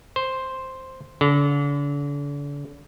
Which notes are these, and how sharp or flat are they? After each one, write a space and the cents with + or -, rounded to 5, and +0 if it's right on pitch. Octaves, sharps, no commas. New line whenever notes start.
C5 +0
D3 -40